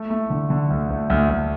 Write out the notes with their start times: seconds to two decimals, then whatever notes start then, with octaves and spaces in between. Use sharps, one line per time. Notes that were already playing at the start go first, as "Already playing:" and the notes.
Already playing: A3
0.10 A3
0.30 D3
0.50 D3
0.70 D2
0.90 D2
1.10 D2
1.30 D2